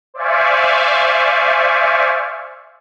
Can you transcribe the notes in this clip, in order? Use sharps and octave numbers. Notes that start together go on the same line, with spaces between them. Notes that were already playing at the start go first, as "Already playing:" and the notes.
C5 D5 E5 F5 G#5 C#6